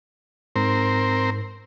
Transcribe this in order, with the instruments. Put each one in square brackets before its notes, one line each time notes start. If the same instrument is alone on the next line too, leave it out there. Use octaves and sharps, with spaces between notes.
[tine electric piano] G#2 [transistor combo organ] C4 A#4 C5